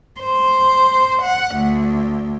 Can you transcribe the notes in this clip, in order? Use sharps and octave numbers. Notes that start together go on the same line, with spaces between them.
C5
F#5
D2